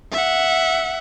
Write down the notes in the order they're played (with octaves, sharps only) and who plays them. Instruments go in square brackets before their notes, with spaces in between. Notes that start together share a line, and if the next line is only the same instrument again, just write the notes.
[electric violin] E5 F#5